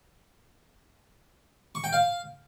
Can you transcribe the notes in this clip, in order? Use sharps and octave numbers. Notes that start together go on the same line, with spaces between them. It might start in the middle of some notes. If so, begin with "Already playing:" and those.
C#6
G5
F5